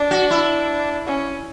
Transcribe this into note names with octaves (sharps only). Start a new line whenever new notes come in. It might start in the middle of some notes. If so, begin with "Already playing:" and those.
Already playing: D4
F#4
E4
C#4